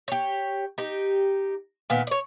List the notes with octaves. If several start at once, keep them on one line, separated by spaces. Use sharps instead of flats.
G4 C#5
D#4 G4
A#2 D#3 B3
C#5 D5